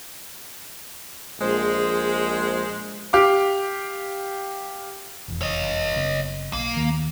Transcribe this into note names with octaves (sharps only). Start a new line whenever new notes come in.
A#1 G#3 C5
G4 F5 D6
F1 E2
C#5 D#5
F#1 C#3 B3
B1 A#3
D#2 D#3